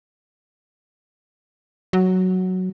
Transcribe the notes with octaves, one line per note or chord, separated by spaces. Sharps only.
F#3